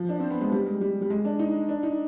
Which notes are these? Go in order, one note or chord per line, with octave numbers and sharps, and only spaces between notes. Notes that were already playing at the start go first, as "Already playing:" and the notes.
Already playing: F3
D4
C4
B3
G#3
G3
G#3
G3
G3
G#3
D4
D#4
D4
D#4